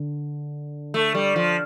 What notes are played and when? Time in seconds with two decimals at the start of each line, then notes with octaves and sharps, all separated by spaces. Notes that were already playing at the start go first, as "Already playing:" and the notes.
Already playing: D3
0.94 A3
1.14 G3
1.36 F3